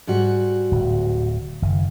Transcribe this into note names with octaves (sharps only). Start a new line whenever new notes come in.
G#2 G3 F#4
D1
F#1 D#3